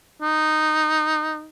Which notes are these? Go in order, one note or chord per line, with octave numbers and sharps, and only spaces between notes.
D#4